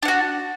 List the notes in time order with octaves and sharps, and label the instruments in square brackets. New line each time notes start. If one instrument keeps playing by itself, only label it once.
[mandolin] D4
F#5
F#4